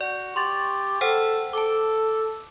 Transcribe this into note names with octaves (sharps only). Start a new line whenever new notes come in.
F#4 D5
G4 C6 C#6 A6
A4 C5 F#5 G5
A4 A5 D6